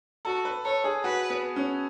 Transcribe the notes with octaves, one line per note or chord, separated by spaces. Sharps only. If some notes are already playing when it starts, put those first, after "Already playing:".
F#4 A4
B4
A4 C#5
G#4
F#4 B4
B3
C#4